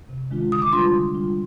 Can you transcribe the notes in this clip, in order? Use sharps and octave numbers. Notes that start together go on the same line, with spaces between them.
C3
D#3 G#3 D4 F4
D3 D#6
D6
G3 D4 F4 C6
D3
G3 D4 F4